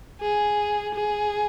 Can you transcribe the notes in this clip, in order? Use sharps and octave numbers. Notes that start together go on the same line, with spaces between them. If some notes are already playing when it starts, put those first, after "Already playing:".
G#4
G#4